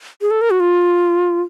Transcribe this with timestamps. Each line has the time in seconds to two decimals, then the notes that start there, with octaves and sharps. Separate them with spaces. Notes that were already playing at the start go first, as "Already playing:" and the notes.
0.21 G#4
0.31 A4
0.41 A#4
0.51 F#4
0.60 F4